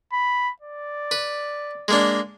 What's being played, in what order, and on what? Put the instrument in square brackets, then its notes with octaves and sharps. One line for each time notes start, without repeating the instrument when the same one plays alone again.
[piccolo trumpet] B5
D5
[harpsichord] B4
G#3 A#3 D4